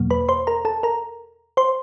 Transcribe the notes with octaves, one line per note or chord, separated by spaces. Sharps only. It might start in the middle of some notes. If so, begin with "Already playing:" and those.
Already playing: E2 B2 F#3 A#3
B4 B5
C5 C6
A#4 A#5
A4 A5
A#4 A#5
C5 C6